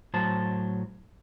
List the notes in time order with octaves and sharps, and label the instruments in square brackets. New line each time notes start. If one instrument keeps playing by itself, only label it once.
[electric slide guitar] A2 F#3 C5 A5